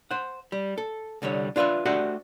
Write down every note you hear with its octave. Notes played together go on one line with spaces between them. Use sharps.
C5 F#5
G3
A4
C2 D3 G3 C#5
D4 F4 F#4 B4 E5
A3 D4 F#4 G4 C5 F#5